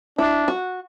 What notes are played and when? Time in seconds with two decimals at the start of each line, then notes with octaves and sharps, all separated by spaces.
0.18 D4 E4
0.48 F#4